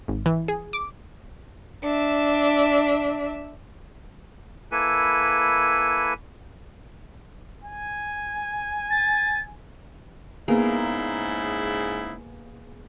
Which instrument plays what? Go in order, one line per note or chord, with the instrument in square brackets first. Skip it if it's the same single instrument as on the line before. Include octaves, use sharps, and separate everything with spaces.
[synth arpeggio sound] G#1
E3
G#4
D6
[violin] D4 E5
[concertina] A#3 E4 A4 B4 G#5
[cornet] G#5
[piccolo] A6
[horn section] G#2 C#3 E4 [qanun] A#3 [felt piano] B3 G#4